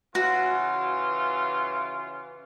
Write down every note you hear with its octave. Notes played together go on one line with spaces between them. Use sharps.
C#3 E3 F4 F#4